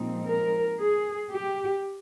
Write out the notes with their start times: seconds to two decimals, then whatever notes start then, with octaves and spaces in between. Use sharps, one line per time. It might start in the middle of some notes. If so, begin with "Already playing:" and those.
Already playing: A#2 F3 G#3 C4 D#4
0.26 A#4
0.79 G#4
1.31 G4